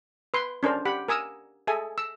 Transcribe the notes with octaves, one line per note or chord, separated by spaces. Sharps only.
B4 C6
C#4 D4 A#4 C5
G4 F#5 B5
A#4 G#5 D#6 E6
G#4 A4 E5 G#5
E6